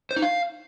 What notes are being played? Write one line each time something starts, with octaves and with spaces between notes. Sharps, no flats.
C5
D#4
F5